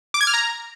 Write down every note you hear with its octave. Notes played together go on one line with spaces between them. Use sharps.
D6
G#6
F6
A#5